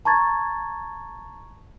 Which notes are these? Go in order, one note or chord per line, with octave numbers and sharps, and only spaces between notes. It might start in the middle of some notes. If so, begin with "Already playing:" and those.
A5 A#5 C#6 G#6 A6